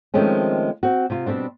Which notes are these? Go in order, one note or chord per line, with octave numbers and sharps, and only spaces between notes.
D#3 F3 G#3 A3 C4 C#4
C4 F#4
C3 F4
B2 G3 A3 C4 D4